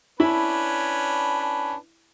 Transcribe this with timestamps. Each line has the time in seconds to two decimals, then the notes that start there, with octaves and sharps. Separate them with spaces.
0.20 C#4 D4 E4 B4 B5